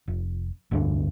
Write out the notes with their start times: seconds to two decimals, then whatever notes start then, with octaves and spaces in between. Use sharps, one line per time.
0.08 F1
0.71 F1 D2 G2 D3